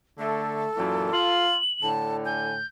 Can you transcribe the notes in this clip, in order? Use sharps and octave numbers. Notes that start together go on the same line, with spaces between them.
D3 A3 A4
F#2 A#2 E3
F4 F#7
A2 D3 A5
G#5 G6